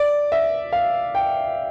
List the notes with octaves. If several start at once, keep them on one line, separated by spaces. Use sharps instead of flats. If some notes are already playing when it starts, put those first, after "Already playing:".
Already playing: D5
E5
F5
G5